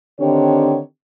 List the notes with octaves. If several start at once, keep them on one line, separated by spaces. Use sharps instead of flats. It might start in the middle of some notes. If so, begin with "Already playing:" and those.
D3 D#3 C4 D4 G4 C#5